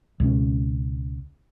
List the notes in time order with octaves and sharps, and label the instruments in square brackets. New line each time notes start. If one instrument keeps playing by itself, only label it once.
[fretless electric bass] C#2 B2 C#4